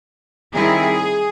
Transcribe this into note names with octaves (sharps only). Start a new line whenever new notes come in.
D#3 G3 C4 E4 G#4